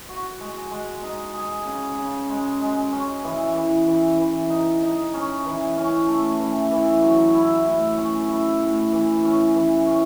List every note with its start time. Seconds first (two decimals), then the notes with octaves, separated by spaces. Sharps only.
0.09 F#4
0.40 G#3
0.71 G#3
1.03 D#4
1.34 G#4
1.65 C#3
1.98 C#3
2.29 G#3
2.61 G#3
2.92 C#4
3.23 E3
3.55 E3
3.87 E3
4.18 E3
4.50 D#4
4.82 D#4
5.14 C#4
5.46 E3
5.77 C#4
6.08 A3
6.40 E3
6.71 E3
7.02 F#3
7.35 E4
7.66 A2
7.97 C#4
8.29 E4
8.61 A2
8.92 E3
9.24 C#4
9.55 E3
9.87 C#4